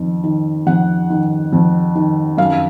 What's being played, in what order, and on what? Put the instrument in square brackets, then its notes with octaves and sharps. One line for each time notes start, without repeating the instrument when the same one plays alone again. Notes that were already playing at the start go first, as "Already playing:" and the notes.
Already playing: [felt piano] F2 D#3
D#3
F2 F#5
D#3
F2
D#3
F#2 F5